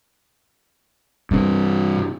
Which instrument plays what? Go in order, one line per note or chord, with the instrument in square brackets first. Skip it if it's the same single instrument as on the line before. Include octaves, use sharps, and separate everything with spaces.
[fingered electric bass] G2 C3